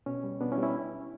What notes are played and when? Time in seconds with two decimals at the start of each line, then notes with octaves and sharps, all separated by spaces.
0.06 B2 C#4
0.24 G3
0.41 B2 B3 D4
0.52 C#4 E4
0.58 G3
0.63 C#4 E4